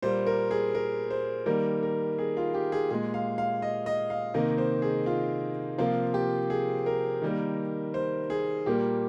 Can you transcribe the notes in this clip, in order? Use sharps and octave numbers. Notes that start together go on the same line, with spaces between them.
A#2 G3 A#3 C5
A#4
G#4
A#4
C5
D#3 G3 A#3 A#4
A#4
G#4
F4
G4
G#4
A#2 G#3 G#4
F5
F5
D#5
D#5
F5
C3 D#3 A#3 D#5
C5
G#4
F4
C3 F3 A#3 F4
G4
G#4
A#4
D#3 G3 A#3
C5
G#4
A#2 G3 A#3 G4